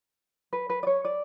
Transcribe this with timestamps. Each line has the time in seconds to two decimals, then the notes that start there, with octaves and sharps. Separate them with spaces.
0.53 B4
0.70 B4
0.83 D5
0.87 C#5
1.05 D5